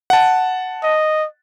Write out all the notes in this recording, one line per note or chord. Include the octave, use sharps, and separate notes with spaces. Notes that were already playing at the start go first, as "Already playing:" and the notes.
F#5 A5
D#5